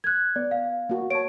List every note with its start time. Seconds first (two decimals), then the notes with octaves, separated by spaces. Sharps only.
0.04 F#6 G#6
0.36 B3 D5
0.51 F5
0.89 A#3 F#4
1.10 C#5 A5 D7